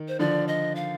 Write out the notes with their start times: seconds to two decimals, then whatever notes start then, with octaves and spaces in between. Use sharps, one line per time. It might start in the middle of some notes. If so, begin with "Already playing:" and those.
Already playing: D#3
0.08 C5
0.19 D3 F3 D5
0.48 D#5
0.76 F5